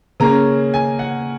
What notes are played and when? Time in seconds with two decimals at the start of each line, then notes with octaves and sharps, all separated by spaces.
0.20 C#3 A#3 C#4 A#5
0.74 G#5
0.99 F#5